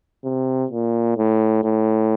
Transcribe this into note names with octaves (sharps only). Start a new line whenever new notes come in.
C3
A#2
A2
A2